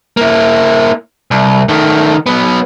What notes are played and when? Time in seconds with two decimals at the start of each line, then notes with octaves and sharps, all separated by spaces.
0.17 A#3 E4
1.31 C2
1.69 D#3 A3
2.26 F#3 B3